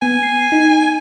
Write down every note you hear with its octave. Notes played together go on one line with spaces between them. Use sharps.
B3 G#5
C7
D#4